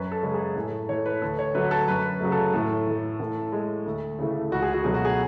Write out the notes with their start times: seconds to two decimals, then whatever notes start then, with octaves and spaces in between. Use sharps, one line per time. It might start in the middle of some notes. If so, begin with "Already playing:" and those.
Already playing: F#2 B4
0.12 A4
0.23 C#3 G#3
0.34 G#4
0.56 A2 A4
0.89 E3 A3 C#5
1.06 B4
1.22 D2 A4
1.39 C#5
1.55 D3 F#3 A3 B4
1.71 A4
1.88 F#2 B4
2.20 C#3 F#3 A3
2.32 A4
2.53 A2 A4
2.87 E3 A3
3.20 A2
3.52 G#3
3.86 D2
4.19 C#3 E3 A3
4.52 C#2 F#4
4.62 G#4
4.73 F#4
4.84 B2 F#3 A3 G#4
4.94 F#4
5.05 G#4